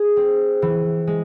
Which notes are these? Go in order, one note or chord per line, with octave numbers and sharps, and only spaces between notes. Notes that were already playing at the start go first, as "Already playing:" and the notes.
Already playing: G#4
C4
E3
G#3